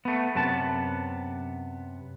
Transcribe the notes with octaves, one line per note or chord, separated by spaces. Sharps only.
A3 B3
F#2 C3 B3 A5